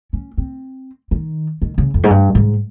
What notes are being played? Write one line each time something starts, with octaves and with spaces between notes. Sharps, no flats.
C#4
C4
D#3
D#3
C#3
F2
G#2
G2
G#2